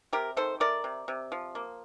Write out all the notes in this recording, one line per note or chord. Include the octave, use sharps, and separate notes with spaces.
C3 G4 A#4
D#3 A4 C5
A3 A#4 D5
C3
C3
F3
A#3